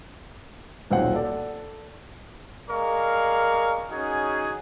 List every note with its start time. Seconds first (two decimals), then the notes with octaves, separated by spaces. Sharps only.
0.90 D#1 B1 C4 F4 F#5
1.13 A4 D5
2.70 G#3 A#4 D5 F5 C#6
3.91 C#4 D#4 F#4 G#4 G#5